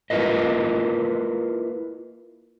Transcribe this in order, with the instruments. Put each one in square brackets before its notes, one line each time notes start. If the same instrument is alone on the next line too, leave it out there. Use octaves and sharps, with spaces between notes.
[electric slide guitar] A#3 E4 F4 A#4 B4 D#5